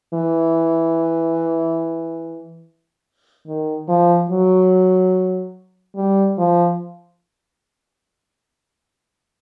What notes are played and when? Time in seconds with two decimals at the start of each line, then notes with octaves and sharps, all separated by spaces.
0.14 E3
3.47 D#3
3.89 F3
4.29 F#3
5.96 G3
6.38 F3